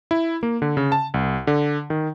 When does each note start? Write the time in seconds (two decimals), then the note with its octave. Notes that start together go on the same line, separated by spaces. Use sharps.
0.11 E4
0.43 A#3
0.62 D3
0.77 C#3
0.92 A5
1.14 C2
1.47 D3
1.90 D#3